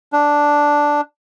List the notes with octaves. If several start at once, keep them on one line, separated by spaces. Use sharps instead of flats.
D4